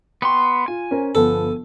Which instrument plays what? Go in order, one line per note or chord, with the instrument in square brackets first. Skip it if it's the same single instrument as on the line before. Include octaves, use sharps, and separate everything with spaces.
[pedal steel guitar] B3 C6 [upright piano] G5 C#6
[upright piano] F4 [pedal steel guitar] G#5
[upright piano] C#4 A#4 C5
[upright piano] G1 F3 B3 [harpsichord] A4